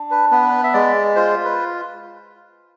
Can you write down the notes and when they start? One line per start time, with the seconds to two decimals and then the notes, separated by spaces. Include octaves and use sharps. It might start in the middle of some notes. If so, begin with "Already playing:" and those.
Already playing: D4
0.11 B4
0.32 B3 B4
0.64 E5
0.73 G#3 D5
1.16 F4 C5
1.45 B4